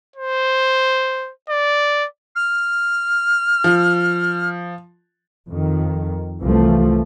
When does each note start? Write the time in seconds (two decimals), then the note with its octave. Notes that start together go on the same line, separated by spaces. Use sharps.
0.16 C5
1.50 D5
2.35 F6
3.64 F3
5.49 F2 D#3
6.40 C2 E3 F3 A3